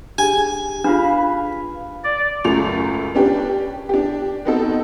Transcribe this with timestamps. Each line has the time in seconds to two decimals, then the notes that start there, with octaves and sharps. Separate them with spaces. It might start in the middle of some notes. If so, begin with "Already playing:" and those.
0.18 D4 G4 G#4 G#5
0.84 D4 F4 B4 F5 B5
2.04 D5
2.44 C#2 F#2 F#3 A3 C#6 F7
3.15 C#4 D4 G4 B4
3.89 D4 G4
4.45 B3 C4 D#4 F#4 A4